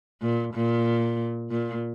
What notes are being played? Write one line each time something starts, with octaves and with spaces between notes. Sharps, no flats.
A#2
A#2
A#2